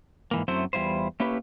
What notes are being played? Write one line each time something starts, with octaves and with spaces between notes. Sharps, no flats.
G#2 E3 A#3
F#2 F#3 A3 C4 E4 C5
E2 G3 E4 F4 C5
A3 A#3 C#4 E4 G4 B4